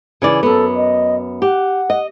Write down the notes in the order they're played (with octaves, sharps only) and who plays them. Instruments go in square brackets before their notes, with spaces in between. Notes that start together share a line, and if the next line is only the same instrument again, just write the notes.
[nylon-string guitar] C#3 E3 D5
[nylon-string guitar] F#2 B3 [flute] A4
[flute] D#5
[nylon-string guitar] G4 [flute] F#5
[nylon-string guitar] D#5